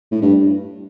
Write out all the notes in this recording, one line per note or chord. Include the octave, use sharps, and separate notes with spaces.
A2
G2